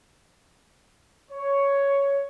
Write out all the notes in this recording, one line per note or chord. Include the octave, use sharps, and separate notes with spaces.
C#5